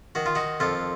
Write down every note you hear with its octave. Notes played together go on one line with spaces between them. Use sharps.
D#3 F#4
F4
D#4 F#4
F2 F4 A4